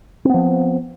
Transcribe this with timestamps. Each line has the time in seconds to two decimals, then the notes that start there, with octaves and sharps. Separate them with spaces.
0.25 C4
0.29 B3
0.34 F3